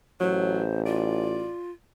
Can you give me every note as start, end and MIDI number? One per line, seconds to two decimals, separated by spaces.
0.20 1.50 33
0.20 0.62 54
0.20 0.81 72
0.86 1.71 65
0.86 1.60 74